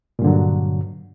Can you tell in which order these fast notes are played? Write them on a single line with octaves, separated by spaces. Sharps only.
A#2 G2 D3 F#3